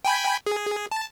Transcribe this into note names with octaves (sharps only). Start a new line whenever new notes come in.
G5 G#5 B5
G#4
A5